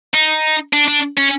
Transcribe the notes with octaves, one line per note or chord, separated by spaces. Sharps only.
D#4
D4
D4
C#4